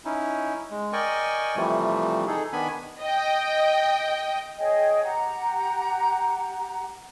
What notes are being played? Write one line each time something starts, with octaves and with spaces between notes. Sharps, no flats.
C#4 D#4 E4
G#3
A#4 D5 D#5 G5 G#5 C#6
C3 E3 F3 G3 A3
D#4 G#4 A4
D#3 B3 D4 G#5 B5
D#5 G5
G#4 C#5 D#5 G5
G4 F#5 A#5